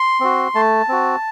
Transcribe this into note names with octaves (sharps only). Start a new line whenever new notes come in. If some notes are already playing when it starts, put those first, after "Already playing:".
Already playing: C6
C4 F#4
A3 A5
C4 F#4